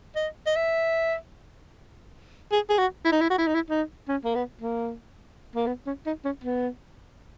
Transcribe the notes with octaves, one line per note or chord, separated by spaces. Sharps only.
D#5
D#5
E5
G#4
G#4
F#4
E4
D#4
E4
F#4
E4
D#4
E4
D#4
C#4
A#3
B3
A#3
A#3
B3
C#4
D#4
C#4
B3